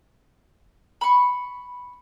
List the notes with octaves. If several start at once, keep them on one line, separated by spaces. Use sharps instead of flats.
B5 C#6